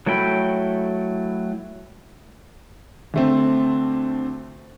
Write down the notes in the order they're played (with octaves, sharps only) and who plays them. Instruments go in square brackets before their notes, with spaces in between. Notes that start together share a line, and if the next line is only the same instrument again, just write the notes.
[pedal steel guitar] F#3 A3 E4 G5 B5
[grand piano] D2 A3 C4